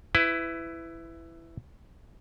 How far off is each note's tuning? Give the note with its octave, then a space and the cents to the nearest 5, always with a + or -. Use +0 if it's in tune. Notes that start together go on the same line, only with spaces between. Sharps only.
E4 +10 B4 +25